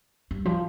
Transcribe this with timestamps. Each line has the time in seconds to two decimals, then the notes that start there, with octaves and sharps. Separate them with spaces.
0.31 G2
0.45 F3